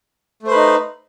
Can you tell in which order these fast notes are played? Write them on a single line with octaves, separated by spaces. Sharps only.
A3 C5 B4 D#4